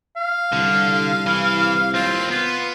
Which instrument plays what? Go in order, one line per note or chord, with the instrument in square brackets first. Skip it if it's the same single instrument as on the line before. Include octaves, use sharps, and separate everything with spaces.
[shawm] F5
[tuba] C2 [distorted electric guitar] D3
[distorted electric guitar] E3
[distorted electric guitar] D#2 C4 [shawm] F4
[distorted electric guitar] B3 [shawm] F4